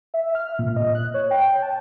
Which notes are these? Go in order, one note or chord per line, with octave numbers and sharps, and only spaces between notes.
E5
F6
A#2
D#5
F#6
C#5
G5
A5